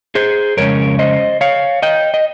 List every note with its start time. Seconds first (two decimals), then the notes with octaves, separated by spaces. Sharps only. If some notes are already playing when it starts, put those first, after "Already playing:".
0.15 G#4 C5
0.57 F2 C#3 G#3 C#4 A#4 C#5
0.99 C5 D#5
1.41 C#5 F5
1.82 D#5 G5
2.14 D#5